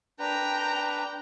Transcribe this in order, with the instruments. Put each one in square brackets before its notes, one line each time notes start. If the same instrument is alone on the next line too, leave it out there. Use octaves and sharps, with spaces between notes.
[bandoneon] D4 B4 [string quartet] G5 A#5